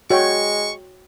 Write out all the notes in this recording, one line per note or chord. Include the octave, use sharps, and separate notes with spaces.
G#3 F#4 C#5 G5 C#6